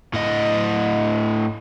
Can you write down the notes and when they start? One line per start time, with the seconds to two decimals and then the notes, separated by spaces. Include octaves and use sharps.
0.13 A2 D#5